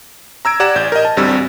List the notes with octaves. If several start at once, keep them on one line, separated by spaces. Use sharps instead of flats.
A#5 E6 G#6 D7
G4 D5 F#5 A#5 G#6 E7
A1 D5 G6
A#4 D#5
A5
A1 D2 G3 C4 E6